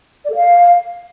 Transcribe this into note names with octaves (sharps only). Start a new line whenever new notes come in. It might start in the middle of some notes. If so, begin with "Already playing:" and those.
D5
A4
F5